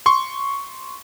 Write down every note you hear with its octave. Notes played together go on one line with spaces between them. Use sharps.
C6 C#6